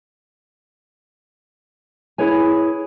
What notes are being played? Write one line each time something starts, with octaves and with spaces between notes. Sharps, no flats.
E4 G#4 B4 C#5 G#5